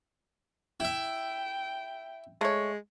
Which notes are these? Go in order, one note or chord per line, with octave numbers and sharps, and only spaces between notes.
E4 E5 G5
G#3 A3 C#5